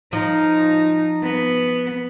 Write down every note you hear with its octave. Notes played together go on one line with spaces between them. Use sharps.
F3 D#4
B3